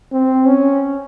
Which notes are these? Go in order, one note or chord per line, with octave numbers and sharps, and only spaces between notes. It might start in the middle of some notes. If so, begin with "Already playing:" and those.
C4
C#4